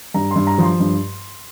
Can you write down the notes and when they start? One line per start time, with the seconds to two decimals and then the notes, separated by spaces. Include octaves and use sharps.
0.14 G2 A#5
0.31 G2 C6
0.47 A#5
0.58 F3 C6
0.80 G2